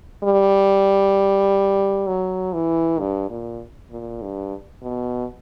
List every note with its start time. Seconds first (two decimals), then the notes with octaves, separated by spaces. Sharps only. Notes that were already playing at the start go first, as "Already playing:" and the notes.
0.24 G3
2.08 F#3
2.53 E3
2.99 G2
3.30 A#2
3.91 A#2
4.22 G2
4.83 B2